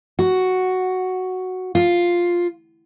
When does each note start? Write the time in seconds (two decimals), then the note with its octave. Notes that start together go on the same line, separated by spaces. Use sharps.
0.19 F#4
1.75 F4